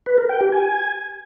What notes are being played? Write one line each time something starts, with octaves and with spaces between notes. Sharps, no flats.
B4
A#4
G5
G4
G#5